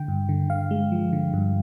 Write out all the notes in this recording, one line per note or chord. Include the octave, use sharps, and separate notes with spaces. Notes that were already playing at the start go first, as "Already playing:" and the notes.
Already playing: D3 G5
G2
D3
D3 F5
G#3
F3
D3
G2